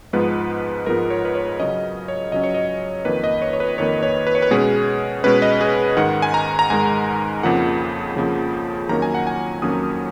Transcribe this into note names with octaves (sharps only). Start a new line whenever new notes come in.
G#2 F3 G#3 B3 B4
G#2 F3 G#3 B3 A#4
C#5
B4
C#5
C#3 F#3 C#4 D#5
C#5
C#3 F#3 C#4 D#5
C#5
D#5
F2 D#3 A#3 B4
D#5
C#5
C#5
B4
F2 D#3 A#3 C#5
C#5
B4
C#5
B4
B2 G#3 C#4 G#4
B2 G#3 C#4 B4
D#5
G#4
G#2 D#3 G#3 F#5
G#5
A#5
A#5
G#2 D#3 G#3 G#5
F2 C#3 F3 A#3 F#5
F2 C#3 F3 A#3
F2 D#3 F#3 A#3 C#4 A#5
G#5
F#5
G#5
F2 D#3 F#3 A#3 C#4 D#6